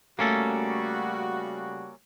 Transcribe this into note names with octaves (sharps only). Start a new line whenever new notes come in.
C#3 G3 A3 A#3 C#4 F#4 A4